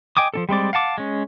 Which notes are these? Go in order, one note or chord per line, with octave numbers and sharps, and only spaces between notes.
D#5 G5 G#5 D6 D#6
F3 D4 A4
G3 G#3 C4 D5
F5 F#5 A5 D6
G#3 C#4